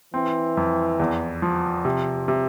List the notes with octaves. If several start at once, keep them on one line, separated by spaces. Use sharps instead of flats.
E3 C4
F2
E2
F3
C3
C3